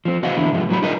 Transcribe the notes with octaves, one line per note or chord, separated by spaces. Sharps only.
F3 C4
C#2 F#4 D#5 F5 F#5
E2 D3 E4
C2 G#2 F3 G#3 F4
A2 F#3 F#4 B5
D#4 F4 G#4 A#4 B4 D#5